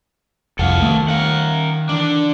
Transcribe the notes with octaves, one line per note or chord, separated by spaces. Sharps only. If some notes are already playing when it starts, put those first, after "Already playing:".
C2 F2 A4 F5 F#5 C#7
D#3 A3 D#6 E6
A#4 F5 F#5
D3 E3 D4